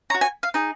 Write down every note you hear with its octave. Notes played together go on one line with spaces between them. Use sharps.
F#4 C#5 A#5
G#5
F5
D#4 G#4